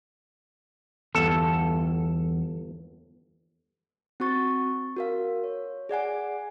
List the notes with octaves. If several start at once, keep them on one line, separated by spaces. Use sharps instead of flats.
G1 E2 A4
C4 F#4 C#6 A6
F#4 A#4 F5
C#5
G#4 D5 F#5 G#5